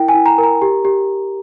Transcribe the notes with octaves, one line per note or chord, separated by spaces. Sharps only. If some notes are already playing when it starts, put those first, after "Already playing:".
Already playing: E4 A#4 G5
G#5
E4
A#5
A#4
A#5
G4
G4